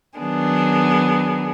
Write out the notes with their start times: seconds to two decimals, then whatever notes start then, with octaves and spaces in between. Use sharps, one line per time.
0.18 D#3 F#3 B3 D4 G#4